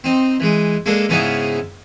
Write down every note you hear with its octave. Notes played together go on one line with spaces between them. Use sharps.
C4 D#4
E3 G#3
G#3 A#3 D4 A4
G#2 C#3 B3 C#4 D#4 E4